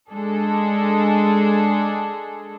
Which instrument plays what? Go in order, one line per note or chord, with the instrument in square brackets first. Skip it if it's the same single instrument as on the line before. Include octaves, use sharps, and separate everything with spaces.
[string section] G#3 D4 G#4 A4